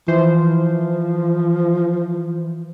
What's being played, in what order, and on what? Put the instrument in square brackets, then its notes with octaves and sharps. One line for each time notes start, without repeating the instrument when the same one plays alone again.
[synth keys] E3 C5 [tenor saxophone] F3